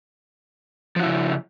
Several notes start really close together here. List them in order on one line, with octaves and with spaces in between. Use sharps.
F3 F#4 E4 C#3